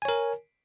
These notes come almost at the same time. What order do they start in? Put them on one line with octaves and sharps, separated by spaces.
G#5 C#5 A#4